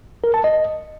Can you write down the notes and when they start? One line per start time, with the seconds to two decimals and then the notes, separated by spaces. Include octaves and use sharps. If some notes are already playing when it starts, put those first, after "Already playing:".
0.24 A#4
0.34 A5
0.44 D#5